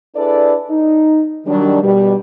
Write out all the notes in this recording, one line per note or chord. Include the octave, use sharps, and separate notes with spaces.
D4 E4 G#4 A4 B4 D5
D#4
D#3 F#3 G3 D4
B2 G3